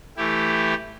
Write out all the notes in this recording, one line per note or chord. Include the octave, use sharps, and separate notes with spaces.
E3 A3 E4 G4